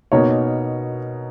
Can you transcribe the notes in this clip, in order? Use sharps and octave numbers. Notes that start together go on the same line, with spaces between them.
B2 A#3 D#4 A#4 C#5